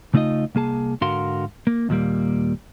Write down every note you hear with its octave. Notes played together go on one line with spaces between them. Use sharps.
C#3 A3 D#4 F4 D#5
C2 A#3 G#4 A5
G#2 D3 F#4 A#4 F5 C6
A#3
D#2 A#2 F#3 G3 A#3